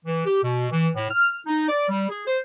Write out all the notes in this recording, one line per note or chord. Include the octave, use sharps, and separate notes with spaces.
E3
G4
B2
E3
A2
F6
D#4
D5
G3
G#4
C5